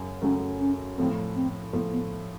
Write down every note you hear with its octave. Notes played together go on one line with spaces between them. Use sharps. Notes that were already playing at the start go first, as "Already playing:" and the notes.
Already playing: F#2 C#3 F#3
F#2 C#3 F#3 A3 C#4
C#4
A2 F3 A3 C4
C4
A2 F3 A3 B3
B3